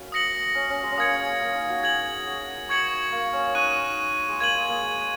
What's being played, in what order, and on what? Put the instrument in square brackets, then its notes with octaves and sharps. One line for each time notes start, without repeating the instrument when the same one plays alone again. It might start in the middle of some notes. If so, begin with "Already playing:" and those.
Already playing: [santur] A#3 C#4 F#4
[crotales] D#6 A#6 C#7 F#7
[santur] C#4
C#4
G#3
C#4
[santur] A#3 [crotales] D#6 G#6 C#7
[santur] A#3
D#4
F#4
[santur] G#4 [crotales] G#6 F#7
[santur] F#4
[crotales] C#6 G#6 C#7 F#7
[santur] A#3
C#4
[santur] D#4 [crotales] C#6 F#6 D#7
[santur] G#3
[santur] A#3 [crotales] G#6 D#7 F#7
[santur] G#3
A#3
G#3